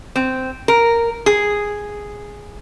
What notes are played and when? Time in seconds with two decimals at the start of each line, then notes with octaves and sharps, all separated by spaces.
0.16 C4
0.68 A#4
1.26 G#4